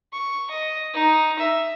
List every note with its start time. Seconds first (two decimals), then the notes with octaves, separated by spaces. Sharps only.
0.13 C#6
0.50 D#5
0.93 D#4
1.39 E5